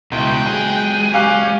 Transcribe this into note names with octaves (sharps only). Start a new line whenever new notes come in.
C#2 B2 E4 G5 F#6
F#3 G#3 G#4
C#4 G4 F5 G#5 F#6